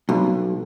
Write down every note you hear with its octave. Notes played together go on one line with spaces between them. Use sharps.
B1